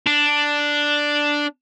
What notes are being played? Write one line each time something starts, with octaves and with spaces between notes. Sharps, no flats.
D4